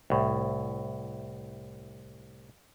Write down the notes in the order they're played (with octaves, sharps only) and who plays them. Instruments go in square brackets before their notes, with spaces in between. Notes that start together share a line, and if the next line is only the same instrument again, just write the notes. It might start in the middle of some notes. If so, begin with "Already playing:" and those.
[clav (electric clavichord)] C2 A2